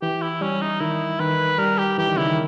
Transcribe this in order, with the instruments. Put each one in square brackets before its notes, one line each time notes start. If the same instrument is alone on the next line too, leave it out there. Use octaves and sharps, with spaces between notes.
[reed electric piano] E3 [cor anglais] G4
[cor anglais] E4
[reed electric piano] G3 [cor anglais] C#4
[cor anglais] D#4
[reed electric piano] D#3 [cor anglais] E4
[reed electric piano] D#3 [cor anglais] B4
[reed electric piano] G3 [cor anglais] A#4
[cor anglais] G4
[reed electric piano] E3 [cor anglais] G4
[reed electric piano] D#3
[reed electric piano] C#3 [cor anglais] E4
[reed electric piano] D#3